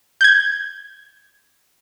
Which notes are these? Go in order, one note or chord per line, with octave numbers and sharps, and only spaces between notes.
G6 G#6